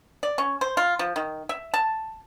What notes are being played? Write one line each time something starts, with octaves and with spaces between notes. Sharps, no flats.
D5
C#4
C5
F4
F3
D#3
E5
A5